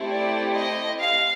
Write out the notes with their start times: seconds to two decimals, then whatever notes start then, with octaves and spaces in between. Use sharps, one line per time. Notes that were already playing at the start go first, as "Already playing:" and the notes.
Already playing: A3 C4 E4 G4
0.08 D5
0.54 D#5
0.99 F5